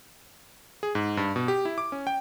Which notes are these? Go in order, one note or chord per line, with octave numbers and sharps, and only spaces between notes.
G#4
G#2
G2
B2
G4
E4
D6
C#4
G5